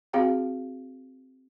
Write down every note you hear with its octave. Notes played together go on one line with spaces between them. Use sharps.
C4 F#4 G#4 F5 G5